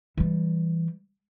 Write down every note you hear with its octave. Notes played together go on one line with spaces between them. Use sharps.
E3 G3